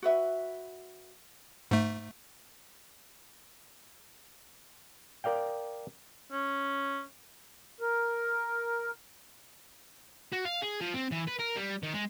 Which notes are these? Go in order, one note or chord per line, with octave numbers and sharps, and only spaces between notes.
F#4 B4 E5
G#2 A3
A#4 D5 F5 G5
C#4
A#4
F#4
F5
G#4
F3
C4
E3
B4
A#4
G3
D#3
G#3